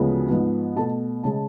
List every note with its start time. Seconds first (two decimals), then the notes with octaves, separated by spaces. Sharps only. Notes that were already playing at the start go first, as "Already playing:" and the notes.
Already playing: D2 C#3 F3 G#3 B3
0.30 G#2 F3 B3
0.76 B2 A3 A5
1.24 C#3 G#3 A5